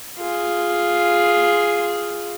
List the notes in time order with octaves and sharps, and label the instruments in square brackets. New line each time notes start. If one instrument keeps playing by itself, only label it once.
[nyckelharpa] F4 G#4